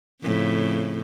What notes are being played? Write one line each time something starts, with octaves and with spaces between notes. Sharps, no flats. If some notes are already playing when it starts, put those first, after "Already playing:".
F2 A2 C#3